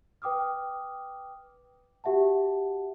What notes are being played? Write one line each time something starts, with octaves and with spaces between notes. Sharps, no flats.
B4 G5 D6 D#6 F6
F#4 G4 E5 F#5 A5